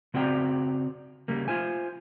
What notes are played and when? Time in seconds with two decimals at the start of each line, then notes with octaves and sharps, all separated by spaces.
0.14 C#3 C4 F#4 D5 G5 A#5
1.28 C#3 G3 A#3
1.48 F4 C5 G#5